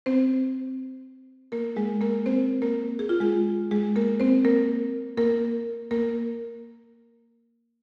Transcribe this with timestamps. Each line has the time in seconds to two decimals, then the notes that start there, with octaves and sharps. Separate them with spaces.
0.06 C4 C5
1.52 A#3 A#4
1.76 G#3 G#4
2.01 A#3 A#4
2.26 C4 C5
2.62 A#3 A#4
2.99 G#4
3.09 F4
3.20 G#3 G#4
3.71 G#3 G#4
3.96 A#3 A#4
4.20 C4 C5
4.45 A#3 A#4
5.18 A#3 A#4
5.91 A#3 A#4